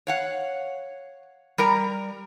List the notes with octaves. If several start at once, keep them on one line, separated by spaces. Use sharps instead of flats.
C#5 F5 F#5
G3 A#4 A#5